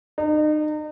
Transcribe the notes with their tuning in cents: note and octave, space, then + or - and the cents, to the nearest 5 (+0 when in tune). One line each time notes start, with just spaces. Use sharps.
D#4 -35